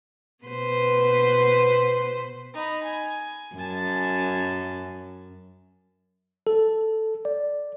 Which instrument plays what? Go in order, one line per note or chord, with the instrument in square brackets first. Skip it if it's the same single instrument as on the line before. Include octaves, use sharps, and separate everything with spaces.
[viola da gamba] B2 B4 C5
[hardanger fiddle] D#4 B5
G#5
[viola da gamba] F#2 [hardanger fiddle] G#5 A5
[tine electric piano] A4
D5